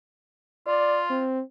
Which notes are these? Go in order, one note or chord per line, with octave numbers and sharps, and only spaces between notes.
F4 D5
C4